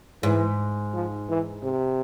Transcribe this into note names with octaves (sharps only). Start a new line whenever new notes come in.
G#2 E3
F3
E3
C3